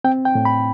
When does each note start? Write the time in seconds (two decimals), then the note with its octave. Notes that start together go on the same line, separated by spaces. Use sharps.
0.04 C4 G5
0.25 G5
0.35 A2
0.45 B5